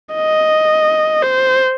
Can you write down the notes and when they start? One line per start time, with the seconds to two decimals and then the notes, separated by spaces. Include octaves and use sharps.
0.15 D#5
1.23 C5